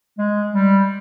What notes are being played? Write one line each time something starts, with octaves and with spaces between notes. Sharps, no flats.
G#3
G3